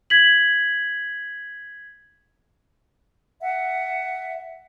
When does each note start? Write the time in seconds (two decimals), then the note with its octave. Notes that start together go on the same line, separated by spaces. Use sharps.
0.10 G#6 B6 F#7
3.40 E5 F#5